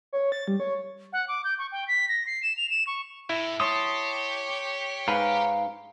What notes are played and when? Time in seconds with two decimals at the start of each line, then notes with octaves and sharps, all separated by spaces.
0.13 C#5
0.32 A6
0.48 G3
0.60 C#5
1.13 F#5
1.28 D6
1.44 G6
1.59 C#6
1.72 G5
1.88 B6
2.09 A#6
2.27 C7
2.43 E7
2.57 F7
2.70 E7
2.87 C#6
3.29 A2 E4
3.60 G4 C#5 A5 C6 D#6
5.08 G#2 B4 F5 A#5